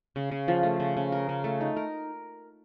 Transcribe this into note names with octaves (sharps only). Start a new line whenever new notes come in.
C#3
C#3
F3
A3
C#3
C#3
A#4
C#3
A3
D#4
A#4